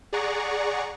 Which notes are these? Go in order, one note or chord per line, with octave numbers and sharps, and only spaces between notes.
G#4 D5 F#5 A#5 C#6